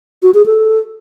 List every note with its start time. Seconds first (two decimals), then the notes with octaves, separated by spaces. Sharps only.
0.22 F#4
0.34 G#4
0.46 A4